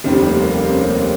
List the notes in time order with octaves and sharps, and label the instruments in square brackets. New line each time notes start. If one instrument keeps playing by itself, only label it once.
[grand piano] F1 D#2 D#3 G3 C4
A#3
A#3
C4
C4
C#4
C4
A#3